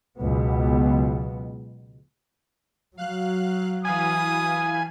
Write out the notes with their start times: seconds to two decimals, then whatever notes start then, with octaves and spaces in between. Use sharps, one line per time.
0.18 C#2 B2 F#3 B3
2.97 F#3 F5 F#6
3.85 E3 F5 G#5 B5 D#6